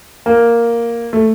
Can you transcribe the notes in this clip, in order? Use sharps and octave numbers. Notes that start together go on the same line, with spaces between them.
A#3
A3